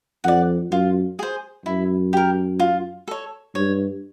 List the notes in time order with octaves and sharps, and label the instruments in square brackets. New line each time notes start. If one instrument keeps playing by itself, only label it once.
[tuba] F2 [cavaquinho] D5 F#5
[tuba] F#2 [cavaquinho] F4
[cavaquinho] G#4 C5
[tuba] F#2 [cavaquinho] E4
[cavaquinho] G4 A#4
F4
A4 C#5
[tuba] G2 [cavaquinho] C#5